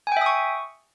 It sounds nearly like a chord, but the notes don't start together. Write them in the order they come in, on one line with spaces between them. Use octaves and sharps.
G#5 G5 E5 D#6 C#6